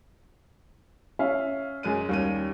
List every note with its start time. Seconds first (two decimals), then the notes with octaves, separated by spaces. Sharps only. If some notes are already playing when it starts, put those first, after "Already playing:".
1.19 C#4 E5 F5
1.83 F#2 G#3 D#7
2.09 D#2 G3 C#4 D#7